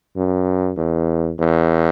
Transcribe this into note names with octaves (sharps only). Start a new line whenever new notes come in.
F#2
E2
E2